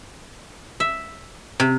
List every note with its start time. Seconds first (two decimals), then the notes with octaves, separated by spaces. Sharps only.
0.80 E5
1.60 C3